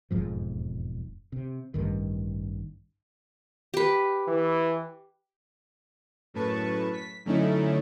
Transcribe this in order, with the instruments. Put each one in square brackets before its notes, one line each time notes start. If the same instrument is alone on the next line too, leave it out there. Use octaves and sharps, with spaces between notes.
[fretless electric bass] E1 F2 G#2 F3
C3
A1 G2 D#3
[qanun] G4 B4
[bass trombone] E3
[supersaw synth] F#2 A2 B4 A5 C#6
B6
F#2 D3 A3 C#4 D#4 E4